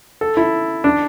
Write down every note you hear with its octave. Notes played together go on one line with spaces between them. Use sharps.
A4
E4
D4